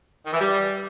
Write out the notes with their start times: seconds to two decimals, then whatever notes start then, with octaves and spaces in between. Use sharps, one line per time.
0.25 D#3
0.33 E3
0.41 G3